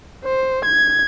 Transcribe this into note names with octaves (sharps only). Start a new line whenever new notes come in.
C5
G#6